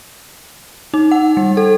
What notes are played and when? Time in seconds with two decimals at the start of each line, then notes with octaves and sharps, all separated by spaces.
0.94 D#4
1.11 F#5
1.37 G3
1.57 A4